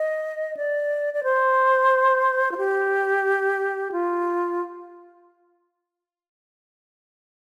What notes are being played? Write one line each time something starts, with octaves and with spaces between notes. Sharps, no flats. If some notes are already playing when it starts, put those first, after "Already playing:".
Already playing: D#5
D5
D5
C5
F4
G4
F4